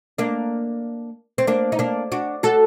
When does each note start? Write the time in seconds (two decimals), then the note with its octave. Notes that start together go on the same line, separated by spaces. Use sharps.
0.18 A#3 D4
1.38 C4
1.47 A#3 D4
1.72 D#4
1.79 A#3 D4
2.12 D4 F#4
2.43 F#4 A4